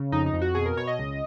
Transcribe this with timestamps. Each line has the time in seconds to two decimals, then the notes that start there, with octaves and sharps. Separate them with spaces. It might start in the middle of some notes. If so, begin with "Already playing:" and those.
Already playing: C#3
0.12 F2 D#4
0.26 D#4
0.33 F2
0.41 F#4
0.55 B2 G#4
0.66 A#4
0.77 B2 C#5
0.87 D#5
0.99 C#2